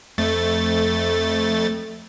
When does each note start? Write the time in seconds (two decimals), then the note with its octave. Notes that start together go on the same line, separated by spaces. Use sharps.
0.18 F2 A3 A6